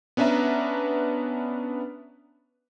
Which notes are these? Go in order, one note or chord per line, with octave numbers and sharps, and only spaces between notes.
B3 C#4 D4 B4 E5 A#5